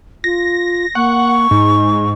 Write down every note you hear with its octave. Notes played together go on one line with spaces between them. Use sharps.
F4 A#6
A#3 F#5 C#6
G#2 D#4